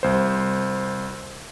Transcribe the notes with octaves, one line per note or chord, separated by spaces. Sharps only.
C2 C5